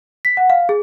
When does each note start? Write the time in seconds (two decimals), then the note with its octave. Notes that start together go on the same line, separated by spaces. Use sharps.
0.25 B6
0.37 F#5
0.50 F5
0.69 G#4